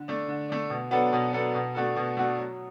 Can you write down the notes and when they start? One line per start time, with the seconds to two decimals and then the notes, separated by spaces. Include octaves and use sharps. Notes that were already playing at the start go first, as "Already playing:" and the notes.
Already playing: D3
0.08 A3 D4
0.28 D3
0.49 A3 D4
0.70 B2
0.91 F#3 B3 D4 A4
1.13 B2
1.33 F#3 B3 D4 A4
1.55 B2
1.75 A3 D4 F#4 A4
1.96 B2
2.17 A3 D4 F#4 A4
2.38 F#3